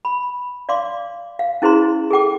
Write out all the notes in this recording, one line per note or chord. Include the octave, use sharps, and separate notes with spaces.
B5
D5 F5 C6 D6
F5
C#4 E4 G#4 C5 A#5 C6
G#4 A4 G5 D6